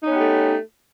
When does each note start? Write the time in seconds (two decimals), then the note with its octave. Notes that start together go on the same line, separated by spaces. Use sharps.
0.02 D#4
0.06 C#4
0.11 B3
0.15 G4
0.20 A3